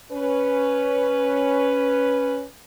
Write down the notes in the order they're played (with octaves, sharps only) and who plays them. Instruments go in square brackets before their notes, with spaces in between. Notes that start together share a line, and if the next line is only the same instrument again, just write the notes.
[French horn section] C#4 B4